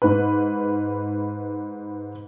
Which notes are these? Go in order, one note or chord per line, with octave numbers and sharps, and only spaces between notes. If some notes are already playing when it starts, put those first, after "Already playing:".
G#2 B4